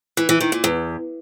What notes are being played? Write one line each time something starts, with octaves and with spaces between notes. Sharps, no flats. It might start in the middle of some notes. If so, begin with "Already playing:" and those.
E3
E3
D#3
A#2
E2